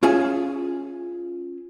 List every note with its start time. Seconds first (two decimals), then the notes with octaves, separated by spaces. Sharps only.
0.03 C#4 F4 G#4 E5 G#5